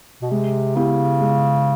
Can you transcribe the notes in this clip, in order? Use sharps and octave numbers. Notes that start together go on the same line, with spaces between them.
B2
C3 G#3
C#3 B3 E4 G4
G#3